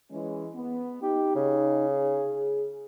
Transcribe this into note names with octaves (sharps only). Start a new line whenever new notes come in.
E3 G#3 C#4
B3
D#4 G4
C#3
G#4